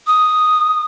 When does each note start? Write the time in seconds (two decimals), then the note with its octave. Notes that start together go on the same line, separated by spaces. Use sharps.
0.07 D#6